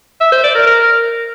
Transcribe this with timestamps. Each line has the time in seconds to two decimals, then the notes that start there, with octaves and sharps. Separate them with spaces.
0.21 E5
0.32 C5
0.44 D5
0.55 A#4
0.66 A#4